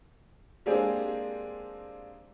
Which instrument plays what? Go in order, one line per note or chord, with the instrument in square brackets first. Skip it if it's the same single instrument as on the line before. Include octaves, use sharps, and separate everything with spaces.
[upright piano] G#3 A#3 C4 D4 G4 G#4